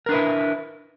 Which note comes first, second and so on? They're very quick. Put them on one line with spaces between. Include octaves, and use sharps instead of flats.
A#4 D4 B4 E4